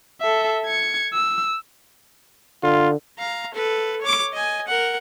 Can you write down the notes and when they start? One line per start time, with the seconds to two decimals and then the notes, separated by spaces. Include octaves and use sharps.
0.21 A4 E5
0.66 G#6 C#7
1.14 E6
2.63 D3 F4
3.19 F5 A#5
3.54 A4 B4
4.02 C#5 D6
4.33 D#5 G#5
4.67 A#4 F#5